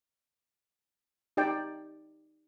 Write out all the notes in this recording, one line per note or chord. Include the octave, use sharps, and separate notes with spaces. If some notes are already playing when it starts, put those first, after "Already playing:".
D#4 G4 D5 G5